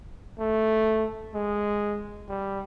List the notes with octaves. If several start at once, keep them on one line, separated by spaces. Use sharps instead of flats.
A3
G#3
G3